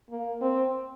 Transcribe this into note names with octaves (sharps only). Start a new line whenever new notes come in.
A#3
C4